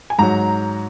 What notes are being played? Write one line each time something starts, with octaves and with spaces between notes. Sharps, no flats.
G#5
G#2 F#3 A#5